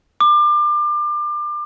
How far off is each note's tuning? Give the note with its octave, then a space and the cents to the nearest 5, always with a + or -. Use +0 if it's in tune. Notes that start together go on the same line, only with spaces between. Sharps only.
D6 +30